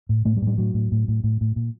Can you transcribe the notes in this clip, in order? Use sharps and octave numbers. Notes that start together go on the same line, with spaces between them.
A2
A2 A3
G3
A2
G3
A2 F#3
A2
A2
A2
A2
A2
A#2